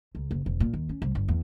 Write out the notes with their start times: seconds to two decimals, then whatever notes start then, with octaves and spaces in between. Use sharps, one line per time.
0.15 C#2
0.31 F#1
0.46 E1
0.60 A#2
0.74 D#2
0.89 C#4
1.02 C2
1.15 G1
1.28 E2